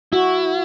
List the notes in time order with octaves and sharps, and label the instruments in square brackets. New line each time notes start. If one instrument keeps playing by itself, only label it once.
[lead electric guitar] E4 [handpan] F#4